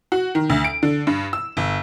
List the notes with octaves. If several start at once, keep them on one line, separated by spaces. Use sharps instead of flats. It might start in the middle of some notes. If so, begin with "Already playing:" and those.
F#4
D#3
D2
D7
D3
G2
E6
G1